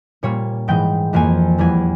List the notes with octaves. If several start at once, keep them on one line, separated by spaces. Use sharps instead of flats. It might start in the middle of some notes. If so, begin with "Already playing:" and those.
A#2 G3 A#3 C#5
G#2 E3 G#3 G5
F2 E3 A#3 G#5
E2 E3 G3 G#5